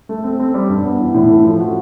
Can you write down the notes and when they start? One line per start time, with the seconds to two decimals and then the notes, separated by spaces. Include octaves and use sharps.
0.09 A3
0.24 C4
0.40 C4
0.54 G3
0.69 G2
0.84 B3
1.00 E3
1.14 A2
1.30 A3
1.45 F3
1.60 F#4